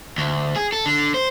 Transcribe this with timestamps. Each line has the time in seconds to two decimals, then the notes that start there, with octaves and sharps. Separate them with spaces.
0.18 D2
0.56 G#4
0.72 A4
0.86 D3
1.14 C5